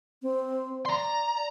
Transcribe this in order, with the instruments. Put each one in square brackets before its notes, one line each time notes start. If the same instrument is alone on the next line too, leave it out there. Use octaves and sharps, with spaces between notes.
[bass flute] C4
[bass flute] D5 [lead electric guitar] A#5 C6